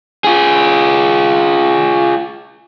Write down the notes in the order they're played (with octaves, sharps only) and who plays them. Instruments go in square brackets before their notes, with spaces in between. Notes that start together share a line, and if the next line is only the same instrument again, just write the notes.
[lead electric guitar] F4 G#4